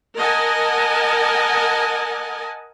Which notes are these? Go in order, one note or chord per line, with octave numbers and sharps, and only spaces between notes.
A#4 D#5 F#5 G#5 A5